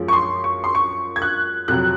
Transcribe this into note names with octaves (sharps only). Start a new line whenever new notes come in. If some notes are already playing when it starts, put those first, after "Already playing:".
Already playing: F#2 F3 G#3
C#6
C6
C#6
C6
C#6
G#6
F#6
F2 C3 F#3 F#6